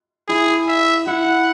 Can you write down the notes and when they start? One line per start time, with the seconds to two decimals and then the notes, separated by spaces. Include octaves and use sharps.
0.28 E4 G#4
0.68 E5
1.07 E4 F#5